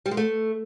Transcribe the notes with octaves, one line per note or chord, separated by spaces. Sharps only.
G3
G#3
A3